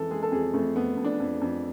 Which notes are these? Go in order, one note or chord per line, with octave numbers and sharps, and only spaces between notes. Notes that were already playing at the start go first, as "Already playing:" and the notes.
Already playing: F2 E3 G#3 A4
G#3 G#4
A4
F2 G#4
F2 A3
F2 B3
F2
D4
F2
F2